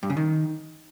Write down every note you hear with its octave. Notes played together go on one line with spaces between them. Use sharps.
G2
C#3
D#3